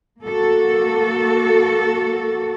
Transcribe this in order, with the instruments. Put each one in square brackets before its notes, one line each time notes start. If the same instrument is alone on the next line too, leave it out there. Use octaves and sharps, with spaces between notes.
[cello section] A#3 F#4 A4